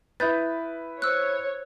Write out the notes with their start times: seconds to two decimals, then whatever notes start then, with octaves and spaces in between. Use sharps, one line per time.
0.20 E4 B4 D#6 G6 A6
1.02 C5 C#5 E6 F#6